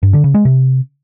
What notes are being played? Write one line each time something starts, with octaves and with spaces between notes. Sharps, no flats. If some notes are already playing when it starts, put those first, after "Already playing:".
G2
D3
C#3
G#3
C3